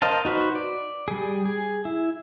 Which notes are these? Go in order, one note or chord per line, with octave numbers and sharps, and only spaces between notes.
A#4 C5 D#5 F5 A5
D#4 F#4 B4 C5
D5
G3 G#4
G#4
E4